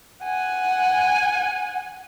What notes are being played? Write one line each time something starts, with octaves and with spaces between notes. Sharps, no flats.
F#5 G#5